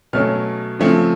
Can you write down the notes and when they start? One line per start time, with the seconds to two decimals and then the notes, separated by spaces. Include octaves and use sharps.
0.13 B2 F#3 A3 C#4 F6
0.79 C#3 F3 A3 C4